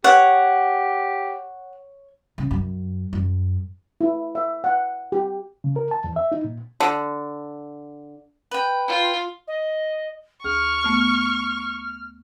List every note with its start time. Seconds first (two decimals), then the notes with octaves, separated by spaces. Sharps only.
0.04 G4 C#5 F#5
2.38 C#3
2.51 F#2
3.13 F#2
4.01 E4
4.35 E5
4.64 F#5
5.12 G4
5.64 C#3
5.76 A#4
5.91 A5
6.04 E2
6.16 E5
6.32 D#4
6.44 A#2
6.80 D3
8.51 B4 G5
8.88 F4
9.47 D#5
10.44 D2 G#4 C#6 F6
10.84 A3 B3